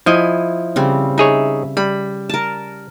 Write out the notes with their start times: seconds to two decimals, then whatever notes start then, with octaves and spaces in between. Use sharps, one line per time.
0.06 F3 E4 D#5 G#5
0.76 C#3 G3 C4
1.18 D#4 G#4 C#5 E5
1.77 G3 B5
2.29 A#4 A5